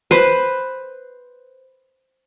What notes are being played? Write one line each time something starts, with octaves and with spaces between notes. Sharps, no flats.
B4 C5